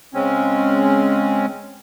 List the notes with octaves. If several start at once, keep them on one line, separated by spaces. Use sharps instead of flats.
C#3 G#3 C4 C#4